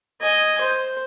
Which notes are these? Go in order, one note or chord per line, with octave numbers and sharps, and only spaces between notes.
D#5 G#5
C5